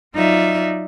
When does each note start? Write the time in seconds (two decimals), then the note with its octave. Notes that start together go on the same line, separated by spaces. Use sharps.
0.14 F#3 D#4 F4 D5 E5